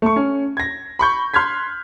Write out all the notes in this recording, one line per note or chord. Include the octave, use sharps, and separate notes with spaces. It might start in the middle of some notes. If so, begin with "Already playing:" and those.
A3 C#6
C#4
G#6 A#6
B5 C#6 G6
C6 F6 F#6 G#6 B6